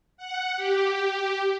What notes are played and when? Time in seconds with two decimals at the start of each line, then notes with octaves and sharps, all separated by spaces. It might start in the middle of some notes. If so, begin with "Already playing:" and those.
0.17 F#5
0.56 G4